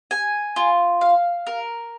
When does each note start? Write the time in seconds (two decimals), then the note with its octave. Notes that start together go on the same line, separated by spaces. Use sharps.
0.11 G#5
0.56 F4
1.01 F5
1.47 A#4